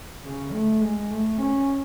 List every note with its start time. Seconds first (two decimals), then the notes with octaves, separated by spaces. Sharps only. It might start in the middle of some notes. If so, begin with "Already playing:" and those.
0.24 C#3
0.52 A3
0.81 G#3
1.10 A3
1.38 C#4